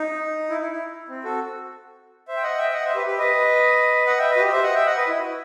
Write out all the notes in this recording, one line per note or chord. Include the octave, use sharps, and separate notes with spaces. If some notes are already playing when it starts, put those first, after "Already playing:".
Already playing: D#4
E4
E4
E4
C4
F#4 A4
C5 E5
G5
D#5 F#5
E5 G5
D#5 F#5
C5 E5
G4 B4
G4 B4
B4 D#5
D#5 F#5
E5 G5
B4 D#5
F#4
G4
C5 E5
D#5 F#5
E5 G5
D#5 F#5
B4 D#5
E4
F#4